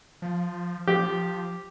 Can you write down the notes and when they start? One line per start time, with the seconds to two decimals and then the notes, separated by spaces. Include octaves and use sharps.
0.22 F3
0.87 F3 G4